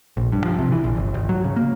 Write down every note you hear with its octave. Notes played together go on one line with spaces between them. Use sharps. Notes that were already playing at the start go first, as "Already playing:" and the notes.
A#1
G2
F3
C3
E3
A#1
G1
G#1
F#3
C#3
A#3